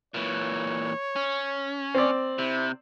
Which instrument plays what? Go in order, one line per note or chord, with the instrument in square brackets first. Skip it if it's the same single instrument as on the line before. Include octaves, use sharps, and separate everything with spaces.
[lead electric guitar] A#2 E3 [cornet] C#5
[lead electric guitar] C#4
[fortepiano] C4 D5
[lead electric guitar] C3 [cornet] E4